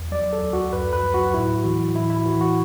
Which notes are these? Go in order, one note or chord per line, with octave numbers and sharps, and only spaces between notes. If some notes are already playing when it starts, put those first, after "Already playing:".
Already playing: E2
F#3 D5
A4
D2
F#4
F#2 B4
B4
F#3
F#4
A2 E4
E3 F#4
A2 E4
E4
E3 F#4
F#4